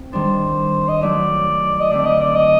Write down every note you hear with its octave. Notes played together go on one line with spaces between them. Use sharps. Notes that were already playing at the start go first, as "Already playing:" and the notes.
Already playing: C4
D#3 G3 D4 C5
D#5
F#3 A3 D#4 D5
D#5
D3 A3 C4 D5
D#5
D5
D#5